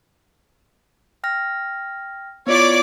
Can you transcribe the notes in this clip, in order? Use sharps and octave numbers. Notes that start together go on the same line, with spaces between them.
G5 F6 A#6
B3 E4 F4 C#5 D5 D6